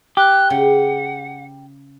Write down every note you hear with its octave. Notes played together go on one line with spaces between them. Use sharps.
G4 F#6
C#3 F#5